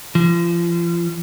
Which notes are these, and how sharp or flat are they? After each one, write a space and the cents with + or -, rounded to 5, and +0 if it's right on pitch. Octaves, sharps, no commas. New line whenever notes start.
F3 -35